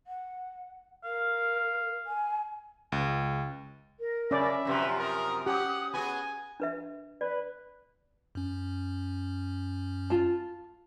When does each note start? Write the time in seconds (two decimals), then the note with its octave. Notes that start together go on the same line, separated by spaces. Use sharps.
0.07 F#5
1.04 A#4 F5
2.07 G#5
2.92 C#2
3.97 A#4
4.31 C#3 C#4 D5 E5
4.65 F#2 C3 F3 G4 B4
4.98 A#4 D#6
5.46 C#4 G4 F#5
5.94 B3 F#4 G#4 G#5
6.60 D4 B4 E5
7.21 B4 D5
8.35 F#2 C#4
10.10 F4 A5